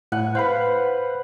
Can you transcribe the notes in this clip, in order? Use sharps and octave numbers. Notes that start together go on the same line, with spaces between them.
A2 F#5 G#5
B4 C5 F5 F#5 B5